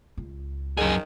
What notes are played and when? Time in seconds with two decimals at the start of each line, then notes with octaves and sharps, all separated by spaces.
0.17 C#2
0.77 F#2 D#3 G#4